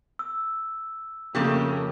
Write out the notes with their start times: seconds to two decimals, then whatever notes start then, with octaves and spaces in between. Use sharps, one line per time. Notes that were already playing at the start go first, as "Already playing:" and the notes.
0.19 E6
1.35 F2 C#3 A3 A#3 G4